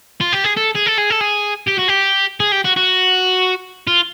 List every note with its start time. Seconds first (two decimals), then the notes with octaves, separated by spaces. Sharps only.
0.21 F4
0.33 G4
0.44 G#4
0.57 A4
0.76 G#4
0.87 A4
0.98 G#4
1.10 A4
1.21 G#4
1.67 G4
1.78 F#4
1.88 G4
2.40 G#4
2.52 G4
2.65 F#4
2.77 F#4
3.87 F4